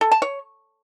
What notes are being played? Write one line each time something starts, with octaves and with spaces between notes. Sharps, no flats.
A4
A5
C#5